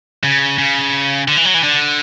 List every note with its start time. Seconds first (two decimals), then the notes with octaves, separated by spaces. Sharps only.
0.24 C#3
0.58 C#3
1.28 D3
1.37 E3
1.45 F#3
1.54 E3
1.63 D3